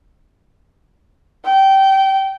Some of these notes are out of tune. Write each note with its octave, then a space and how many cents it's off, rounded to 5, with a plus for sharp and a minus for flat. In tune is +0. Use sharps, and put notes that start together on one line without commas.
G5 -20